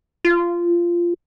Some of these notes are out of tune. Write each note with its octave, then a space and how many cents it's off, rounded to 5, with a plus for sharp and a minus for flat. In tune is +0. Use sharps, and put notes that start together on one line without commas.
F4 -15